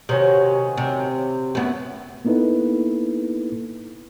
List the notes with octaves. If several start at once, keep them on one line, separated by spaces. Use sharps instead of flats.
C3 D#3 F#3 C#4
C3
F#2 A3 B3 E4 B4
A#3 B3 D#4 E4 A4 B4